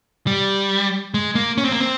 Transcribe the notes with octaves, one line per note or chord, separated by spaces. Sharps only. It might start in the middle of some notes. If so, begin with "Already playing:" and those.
G3
G#3
A#3
C#4
C4
A#3
C4